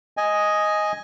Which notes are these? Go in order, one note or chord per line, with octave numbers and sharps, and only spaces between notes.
D#5 G#5